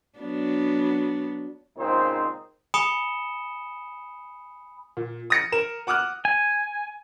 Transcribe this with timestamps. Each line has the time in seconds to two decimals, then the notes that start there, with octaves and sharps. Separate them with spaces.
0.19 F#3 B3 D4
1.78 C#2 A#2 C4 D#4 C5
2.74 G#5 B5 D#6 C#7 E7 G7
4.97 A#2
5.30 D#6 A#6 C#7
5.52 A#4 E7
5.87 F#5 D6 D#6 F6 F#6
6.25 G#5